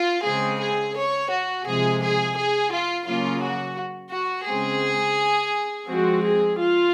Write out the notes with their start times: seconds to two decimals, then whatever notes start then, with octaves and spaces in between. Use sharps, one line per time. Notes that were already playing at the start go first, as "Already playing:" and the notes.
Already playing: F4
0.24 C#3 G#3 C4 G#4
0.59 G#4
0.95 C#5
1.30 F#4
1.65 C3 F3 G#3 G#4
2.00 G#4
2.36 G#4
2.71 F4
3.06 C#3 F#3 A#3 C#4 F4
3.41 F#4
4.11 F#4
4.46 C#3 G#3 C4 G#4
5.87 F3 G#3 C4 F#4
6.23 G#4
6.58 F4